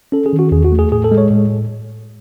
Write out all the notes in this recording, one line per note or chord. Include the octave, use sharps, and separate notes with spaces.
C#4 A4
G#4
D#3
F#4
E2 G#4
F#4
A3
G#4
A2 G#4
A4
G#3
C#5
A2